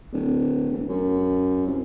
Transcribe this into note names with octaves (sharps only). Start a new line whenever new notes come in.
D1
E1
F#2
C2